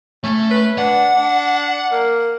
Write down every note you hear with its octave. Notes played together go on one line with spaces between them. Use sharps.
A3 C#4
B4
D4 F#5
D4
A#3